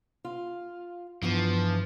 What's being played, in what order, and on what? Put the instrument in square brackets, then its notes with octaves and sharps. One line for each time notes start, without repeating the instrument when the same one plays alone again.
[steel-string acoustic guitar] F4
[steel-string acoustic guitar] E2 E3 [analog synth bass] G2 [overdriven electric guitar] F3